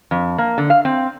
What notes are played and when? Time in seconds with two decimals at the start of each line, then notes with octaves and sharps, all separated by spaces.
0.11 F2
0.38 A#3
0.58 D3
0.70 F5
0.85 C4